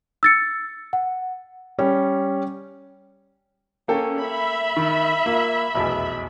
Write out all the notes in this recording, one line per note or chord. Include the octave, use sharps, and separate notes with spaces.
E6 A6 C#7
F#5
G3 C#4
A#3 C#4 A4 G5
E5 B5
D#3
A#3 F4
F1 B1 E2